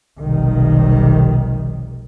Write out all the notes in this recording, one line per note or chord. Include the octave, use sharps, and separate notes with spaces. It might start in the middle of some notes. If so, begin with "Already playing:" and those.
F1 B1 C3 D#3 G3